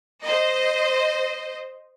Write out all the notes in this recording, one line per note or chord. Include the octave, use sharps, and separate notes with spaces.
C5 D#5